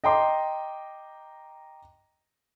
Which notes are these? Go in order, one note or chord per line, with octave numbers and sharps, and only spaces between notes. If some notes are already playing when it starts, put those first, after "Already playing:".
D#5 G5 A#5 C6 D6